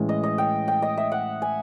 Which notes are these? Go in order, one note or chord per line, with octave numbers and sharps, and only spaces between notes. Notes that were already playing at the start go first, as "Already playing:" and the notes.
Already playing: A2 E3 G#3 C#4
D#5
D#5
G5
G5
D#5
E5
F#5
G#5